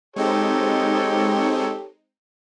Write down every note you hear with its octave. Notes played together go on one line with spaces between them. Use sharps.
G#3 C4 D#4 G4 A4 C#5